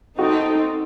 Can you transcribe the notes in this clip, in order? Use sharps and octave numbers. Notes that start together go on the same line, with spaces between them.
C4 D#4 F#4 A4